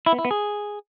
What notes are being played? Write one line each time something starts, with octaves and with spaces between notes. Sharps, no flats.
E4
B3
E4
B3
G#4